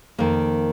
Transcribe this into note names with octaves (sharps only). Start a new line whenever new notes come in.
F2 D#3 A#3